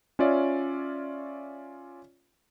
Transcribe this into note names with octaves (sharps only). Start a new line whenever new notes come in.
C#4 F4 C#5 D5 E5